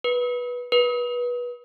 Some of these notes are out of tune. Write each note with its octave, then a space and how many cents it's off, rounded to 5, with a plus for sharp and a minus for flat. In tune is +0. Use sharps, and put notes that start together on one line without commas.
B4 -15
B4 -25